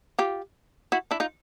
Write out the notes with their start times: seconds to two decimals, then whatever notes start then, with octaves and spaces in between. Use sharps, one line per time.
0.19 F4 G4
0.92 E4 F#4
1.11 D4 E4
1.20 D#4 F4